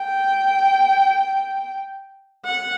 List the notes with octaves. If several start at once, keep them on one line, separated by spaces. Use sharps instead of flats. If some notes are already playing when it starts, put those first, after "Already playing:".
Already playing: G5
F#5